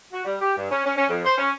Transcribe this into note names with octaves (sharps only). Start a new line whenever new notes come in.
F#4
G3
G4
G2
C#4
C#4
C#4
F2
C5
C#4